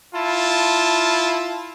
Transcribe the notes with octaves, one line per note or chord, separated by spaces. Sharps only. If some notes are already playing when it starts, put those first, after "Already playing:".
E4 F4 A5